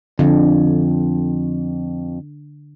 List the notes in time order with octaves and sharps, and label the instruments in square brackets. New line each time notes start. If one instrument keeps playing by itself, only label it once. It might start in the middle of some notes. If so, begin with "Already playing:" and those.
[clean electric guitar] F2 [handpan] D3